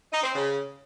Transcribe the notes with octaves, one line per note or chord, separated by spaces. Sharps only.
D#4
C4
C#3